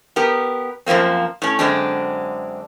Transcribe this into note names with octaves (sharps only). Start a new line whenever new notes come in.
B3 G4 A#4
F#2 F3 G3 A#3 C4
A2 C#4
F#2 D3 G#3 C4 D4